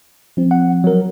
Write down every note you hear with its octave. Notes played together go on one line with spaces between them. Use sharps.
F3 C4
F#5
F#3 A#4